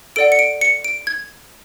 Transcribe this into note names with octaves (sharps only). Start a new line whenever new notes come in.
A4 D5 F#5 D7
C#7
D7
C#7
D7
G#6